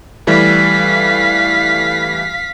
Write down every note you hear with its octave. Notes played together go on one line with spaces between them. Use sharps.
E3 G3 A3 F5 B6